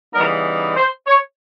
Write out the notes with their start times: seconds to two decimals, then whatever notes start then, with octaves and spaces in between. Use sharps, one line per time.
0.14 C#3 E3 G3 B3 D#4 A#4
0.76 C5
1.07 C#5